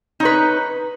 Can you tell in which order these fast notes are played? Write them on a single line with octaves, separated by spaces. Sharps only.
D#4 C#5 B4